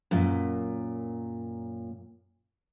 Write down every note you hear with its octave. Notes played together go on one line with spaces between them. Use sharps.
F#2 A#2